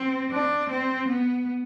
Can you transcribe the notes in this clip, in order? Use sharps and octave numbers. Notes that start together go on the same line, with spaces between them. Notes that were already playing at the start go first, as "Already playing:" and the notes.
Already playing: C4
D4
C4
B3